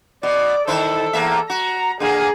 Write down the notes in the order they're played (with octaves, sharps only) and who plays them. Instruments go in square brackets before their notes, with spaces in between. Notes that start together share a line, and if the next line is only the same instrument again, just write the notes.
[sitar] B2 [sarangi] D5
[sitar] D#3 E4 C5 [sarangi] A4
[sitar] E2 A#3 E5
[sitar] F#4 [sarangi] A#5
[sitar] D3 A#3 [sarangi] G#4